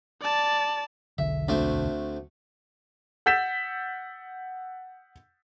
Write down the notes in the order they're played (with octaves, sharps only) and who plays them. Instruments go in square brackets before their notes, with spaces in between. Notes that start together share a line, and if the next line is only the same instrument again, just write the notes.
[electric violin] D5 A5
[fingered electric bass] E1 B1 D3 [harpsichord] E5
[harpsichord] D2 A3 C4
[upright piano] F#5 E6 G6 A6 B6 E7